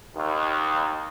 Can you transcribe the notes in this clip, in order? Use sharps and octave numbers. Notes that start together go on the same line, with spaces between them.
D#2